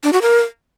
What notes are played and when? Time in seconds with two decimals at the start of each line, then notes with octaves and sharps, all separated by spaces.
0.03 D4
0.13 F#4
0.22 A#4